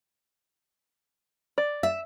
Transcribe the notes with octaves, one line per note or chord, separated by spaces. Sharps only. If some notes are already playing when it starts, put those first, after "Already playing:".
D5
E5